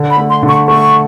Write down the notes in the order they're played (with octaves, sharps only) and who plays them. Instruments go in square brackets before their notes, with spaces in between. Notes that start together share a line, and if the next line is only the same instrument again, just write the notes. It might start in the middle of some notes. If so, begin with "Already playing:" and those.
Already playing: [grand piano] D3
[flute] B5
[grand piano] A3
[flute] C6
[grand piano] D3
[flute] C#6
[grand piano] A3 [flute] C#6